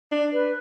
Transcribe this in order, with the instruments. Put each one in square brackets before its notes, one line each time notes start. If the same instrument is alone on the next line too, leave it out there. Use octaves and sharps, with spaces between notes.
[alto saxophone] D4
[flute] B4